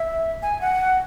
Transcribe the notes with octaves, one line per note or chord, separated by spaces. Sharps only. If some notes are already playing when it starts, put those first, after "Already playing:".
Already playing: E5
G#5
F#5